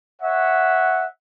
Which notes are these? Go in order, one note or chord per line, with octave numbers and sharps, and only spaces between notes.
C#5 E5 F#5